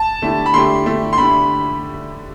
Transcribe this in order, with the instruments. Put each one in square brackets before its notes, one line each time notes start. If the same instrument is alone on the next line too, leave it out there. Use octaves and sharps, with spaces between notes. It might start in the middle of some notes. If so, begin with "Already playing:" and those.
Already playing: [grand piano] A5
[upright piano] D3 A3 E4 G4
[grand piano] B5
[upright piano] D3 A3 E4 G4 [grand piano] C6
[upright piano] D3 A3 E4 G4
[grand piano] C6
[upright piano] D3 A3 E4 G4 [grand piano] B5